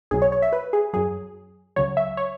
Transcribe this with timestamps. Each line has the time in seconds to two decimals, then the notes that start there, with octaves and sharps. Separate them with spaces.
0.11 B1 B2 F#3 G#4
0.22 C#5
0.32 C#5
0.42 E5
0.53 B4
0.73 G#4
0.94 F#2 F#3 G#4
1.76 C#2 C#3 F#3 C#5
1.97 E5
2.17 C#5